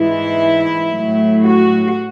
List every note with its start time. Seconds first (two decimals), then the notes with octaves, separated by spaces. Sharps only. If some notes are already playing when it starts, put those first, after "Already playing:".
Already playing: G#2 E3 G#3 E4
0.89 A2 F#3
1.43 F#4